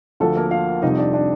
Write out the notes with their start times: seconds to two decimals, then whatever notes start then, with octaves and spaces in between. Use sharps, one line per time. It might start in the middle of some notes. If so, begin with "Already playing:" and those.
0.20 D2 D3 F3 A4
0.36 A#3 A#4
0.51 F4 F5
0.82 F2 C3 G3 D#4 D#5
0.98 D4 D5
1.13 D4 D5